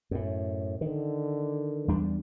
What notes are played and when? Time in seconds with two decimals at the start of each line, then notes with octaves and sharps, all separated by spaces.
0.11 F#2 A2
0.81 D3 D#3
1.88 E2 G3 D4